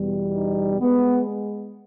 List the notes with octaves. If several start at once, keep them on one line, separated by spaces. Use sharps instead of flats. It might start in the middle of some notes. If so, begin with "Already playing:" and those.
Already playing: E2 B2 G3
D#4
G#3 B3